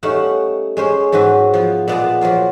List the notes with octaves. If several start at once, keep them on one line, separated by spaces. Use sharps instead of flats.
G3 A3 C#4 D#4 F5 F#5
G#3 C#4 C5
G#2 F#3 C4 F#4 B4
F3 B3
A#2 G#3 B3 D5 A5 A#5
F3 F#3 A#3 F4